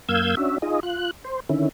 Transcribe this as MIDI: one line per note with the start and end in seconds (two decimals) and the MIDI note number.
0.09 0.35 42
0.09 0.35 58
0.09 0.35 77
0.09 0.35 88
0.09 0.35 91
0.09 0.35 92
0.37 0.58 61
0.37 0.58 62
0.37 0.58 66
0.37 0.58 76
0.62 0.80 63
0.62 0.80 65
0.62 0.80 68
0.62 0.80 75
0.83 1.11 65
0.83 1.11 90
1.25 1.40 72
1.49 1.69 50
1.49 1.69 51
1.49 1.69 61
1.49 1.69 64